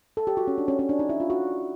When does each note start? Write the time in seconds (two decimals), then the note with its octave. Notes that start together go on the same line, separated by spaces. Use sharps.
0.17 A4
0.27 G4
0.37 F#4
0.48 C#4
0.58 D4
0.68 C#4
0.79 C#4
0.89 D4
0.99 D#4
1.09 E4
1.20 F4
1.30 F#4